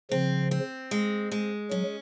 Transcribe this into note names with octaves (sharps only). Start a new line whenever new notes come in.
C#3 F3 C4
C4
G#3
G#3
F#3 C#4